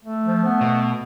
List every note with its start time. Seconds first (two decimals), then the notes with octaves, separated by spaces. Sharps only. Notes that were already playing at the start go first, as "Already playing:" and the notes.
0.05 A3
0.26 F3
0.45 B3
0.61 B2